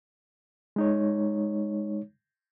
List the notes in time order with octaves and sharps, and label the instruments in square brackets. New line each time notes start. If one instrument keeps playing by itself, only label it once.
[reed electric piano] G#3 D#4 C#5